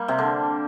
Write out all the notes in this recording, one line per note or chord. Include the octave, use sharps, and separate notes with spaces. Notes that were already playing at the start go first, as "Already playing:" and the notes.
Already playing: G3 A#3
C3 C4
D3 D4